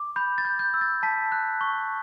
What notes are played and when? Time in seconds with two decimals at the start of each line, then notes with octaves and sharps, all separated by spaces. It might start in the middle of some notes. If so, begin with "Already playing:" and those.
Already playing: D6
0.16 B5 G6
0.38 A6
0.45 G6
0.59 G6
0.74 E6
0.81 A6
1.03 A5 B6
1.32 F#6
1.61 C#6